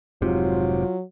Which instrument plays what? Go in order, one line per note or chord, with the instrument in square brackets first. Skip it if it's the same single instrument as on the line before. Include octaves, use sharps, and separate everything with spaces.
[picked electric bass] F1 G#2 C3 [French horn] F#3 [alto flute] F4